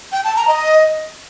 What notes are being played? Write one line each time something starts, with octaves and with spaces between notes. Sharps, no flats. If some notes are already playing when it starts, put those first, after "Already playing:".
G5
A5
A#5
D#5